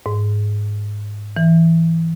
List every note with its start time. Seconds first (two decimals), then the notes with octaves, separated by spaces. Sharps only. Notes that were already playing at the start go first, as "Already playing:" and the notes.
0.06 G#2
1.37 E3